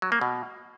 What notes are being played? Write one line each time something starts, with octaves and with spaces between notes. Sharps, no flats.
F#3
A#3
B2